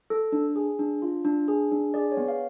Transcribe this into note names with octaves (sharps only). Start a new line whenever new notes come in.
A4
D4
G#4
D4
F4
D4
G#4
D4
G#4 D5
C#5
B3
F5